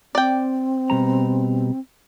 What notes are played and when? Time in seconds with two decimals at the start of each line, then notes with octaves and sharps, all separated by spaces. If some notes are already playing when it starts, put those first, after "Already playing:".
0.15 C4 D5 G5
0.90 B2 G3 A#5